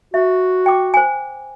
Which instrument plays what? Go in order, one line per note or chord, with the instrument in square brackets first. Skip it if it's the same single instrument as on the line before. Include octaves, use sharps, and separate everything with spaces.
[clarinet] F#4 [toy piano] E5
[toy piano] G5 D6
C5 G#5